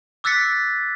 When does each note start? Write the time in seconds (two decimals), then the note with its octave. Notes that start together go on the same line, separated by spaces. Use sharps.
0.24 D6 E6 F#6 A6 B6 C#7